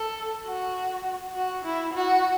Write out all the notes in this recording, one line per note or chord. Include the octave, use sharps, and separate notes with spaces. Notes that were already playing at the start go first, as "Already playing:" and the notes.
Already playing: A4
F#4
F#4
E4
F#4